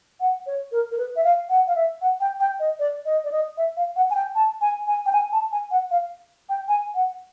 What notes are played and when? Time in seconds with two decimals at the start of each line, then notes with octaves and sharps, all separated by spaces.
0.20 F#5
0.46 C#5
0.72 A#4
0.92 A#4
0.98 B4
1.16 E5
1.24 F5
1.49 F#5
1.67 F5
1.75 E5
2.01 F#5
2.20 G5
2.40 G5
2.60 D#5
2.79 D5
3.06 D#5
3.24 D5
3.32 D#5
3.57 E5
3.77 F5
3.96 F#5
4.10 G#5
4.15 G5
4.35 A5
4.61 G#5
4.87 G#5
5.06 G5
5.13 G#5
5.32 A5
5.52 G#5
5.71 F#5
5.91 F5
6.49 G5
6.68 G#5
6.94 F#5